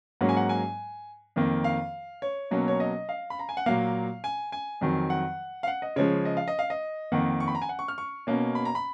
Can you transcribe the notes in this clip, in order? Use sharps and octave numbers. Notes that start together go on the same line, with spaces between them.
G#2 F#3 A#3 C#4 F#5
G#5
F#5
G#5
F2 D#3 A#3
F5
C#5
B2 F#3 A#3 C#4
C#5
D#5
F5
B5
A#5
G#5
F#5
A#2 F#3 A#3 F5
G#5
G#5
F2 D#3 F#3
F#5
F5
F#5
D#5
C#3 F3 G#3 C#5
D#5
F5
D#5
F5
D#5
F2 D#3 A#3 F#5
C#6
B5
A#5
G#5
F#5
C#6
F6
C#6
B2 A#3 C#4
B5
A#5
B5